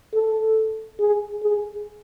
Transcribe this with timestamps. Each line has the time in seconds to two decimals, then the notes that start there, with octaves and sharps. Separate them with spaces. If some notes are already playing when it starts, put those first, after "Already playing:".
0.14 A4
1.00 G#4
1.42 G#4